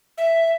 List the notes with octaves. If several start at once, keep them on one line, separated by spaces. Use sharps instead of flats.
E5